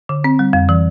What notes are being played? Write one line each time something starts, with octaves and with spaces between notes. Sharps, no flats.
D3
C4
G3
F2
E3